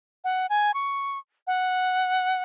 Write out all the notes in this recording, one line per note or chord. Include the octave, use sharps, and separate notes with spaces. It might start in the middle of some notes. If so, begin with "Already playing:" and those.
F#5
G#5
C#6
F#5